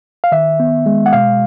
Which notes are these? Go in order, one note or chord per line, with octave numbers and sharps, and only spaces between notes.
F5
D#3 E5
B3
G#3
F#5
B2 F5